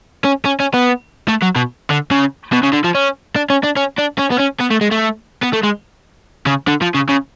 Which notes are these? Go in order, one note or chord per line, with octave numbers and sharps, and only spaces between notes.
C#4
C#4
C#4
B3
A3
F#3
B2
D3
C#3
B2
C#3
D3
F3
C#4
D4
C#4
D4
C#4
D4
C#4
B3
C#4
B3
A3
G#3
A3
B3
A3
G#3
C#3
D3
F3
C#3
C#3